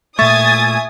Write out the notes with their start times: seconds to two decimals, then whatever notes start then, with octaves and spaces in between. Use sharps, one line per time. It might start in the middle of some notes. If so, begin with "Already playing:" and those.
0.19 A#2 A3 E5 G#5 C#6 D#6 G#6 A6